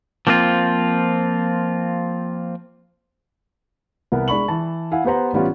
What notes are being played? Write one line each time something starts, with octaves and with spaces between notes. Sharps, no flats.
F3 A#3 C4 D4 F4
C2 B3 A#4
G#3 D4 D5 B5 C#6 F#7
E3 A5
E4 F5 F#5 G#5
B3 G4 B4 C5 F#5 A#5
A1 E3 G3 B3 C#4 F4